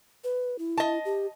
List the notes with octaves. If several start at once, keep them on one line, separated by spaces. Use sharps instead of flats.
B4
E4
D#5 A5
G4